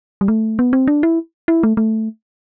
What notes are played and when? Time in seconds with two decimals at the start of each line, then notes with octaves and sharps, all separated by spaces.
0.21 G3
0.28 A3
0.59 B3
0.73 C4
0.88 D4
1.03 E4
1.48 E4
1.63 A3
1.77 A3